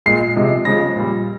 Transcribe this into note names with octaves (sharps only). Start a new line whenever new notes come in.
A#2 G#3 C7
C3 F3 G#3
C#3 F3 G#3 A#6
A#2 G3